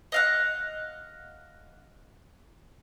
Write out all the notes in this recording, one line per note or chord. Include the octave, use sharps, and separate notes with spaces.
D#5 F5 F#5